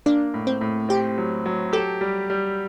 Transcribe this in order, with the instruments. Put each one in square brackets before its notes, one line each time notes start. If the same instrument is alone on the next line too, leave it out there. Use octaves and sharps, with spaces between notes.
[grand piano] A#3 [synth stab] D4
[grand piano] A2
[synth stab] C4
[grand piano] A2
[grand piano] C4 [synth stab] G4
[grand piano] F#3
F#3
[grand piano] G4 [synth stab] A4
[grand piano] G3
G3